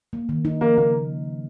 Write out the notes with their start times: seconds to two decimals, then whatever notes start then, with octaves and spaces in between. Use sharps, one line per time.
0.13 A#3
0.29 D#3
0.45 D#4
0.61 F3 A#3
0.78 C#3 A#3